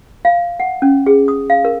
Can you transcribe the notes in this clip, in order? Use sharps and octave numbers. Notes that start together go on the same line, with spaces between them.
F5
F#5
C#4
G#4
D#6
F5
A#4